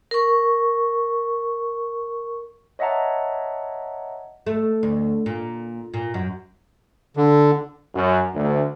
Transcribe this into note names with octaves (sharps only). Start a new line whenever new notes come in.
A#4 C#6
C#5 D#5 E5 F#5 A5 A#5
A3
D2
A#2
A#2
F#2
D3
F#2
D2